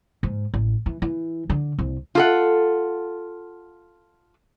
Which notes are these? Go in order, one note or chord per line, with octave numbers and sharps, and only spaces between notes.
G#2
A1
E3
E3
D3
C2
F4 A4 F#5